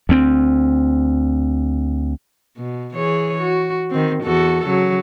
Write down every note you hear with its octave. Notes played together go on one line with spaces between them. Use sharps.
D2 C4
B2
E3 G#4 C#5
F#4
D#3 C4
E2 F#4 A4
C#3 F#3